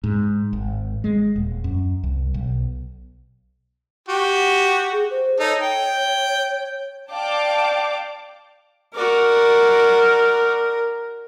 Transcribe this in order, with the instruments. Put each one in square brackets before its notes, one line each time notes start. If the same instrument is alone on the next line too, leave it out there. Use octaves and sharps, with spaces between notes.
[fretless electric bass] G#2
G#1
G#3
D#1
F#2
C2
B1
[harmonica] F#4 G4
[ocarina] G#4
C5
[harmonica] D#4 A4 [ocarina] C#5
[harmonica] G5
[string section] D5 F5 G5 A5 D6
[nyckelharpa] F#4 D5 [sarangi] A#4